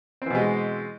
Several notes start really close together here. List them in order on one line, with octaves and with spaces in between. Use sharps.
C4 E3 B2 G#3